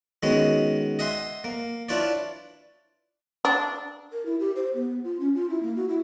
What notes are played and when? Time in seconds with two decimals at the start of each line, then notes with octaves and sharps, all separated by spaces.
0.23 D#3 G#3 B3 C#4 F#4
0.99 D#5 E5 F#5 G#5 C6
1.44 A#3
1.89 D4 E4 F4 B4 C#5 D5
3.45 D4
4.12 A#4
4.26 E4
4.40 G4
4.56 C5
4.75 B3
5.04 F4
5.20 C#4
5.36 F4
5.50 E4
5.63 A#3
5.76 F#4
5.89 E4